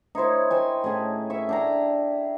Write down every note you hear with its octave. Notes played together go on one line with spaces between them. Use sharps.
D#4 E4 C5 C#5
C5 G5 G#5
A2 C#4 G#4
E5 C#6
D4 G5 A#5